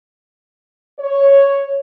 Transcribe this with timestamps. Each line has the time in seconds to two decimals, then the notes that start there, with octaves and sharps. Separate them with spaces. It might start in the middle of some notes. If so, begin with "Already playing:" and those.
0.99 C#5